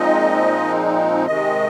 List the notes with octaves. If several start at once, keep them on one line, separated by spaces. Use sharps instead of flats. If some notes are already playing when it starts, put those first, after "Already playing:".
Already playing: A#2 F3 G#3 C4 D#4 D#5
C3 D#3 G#3 D#5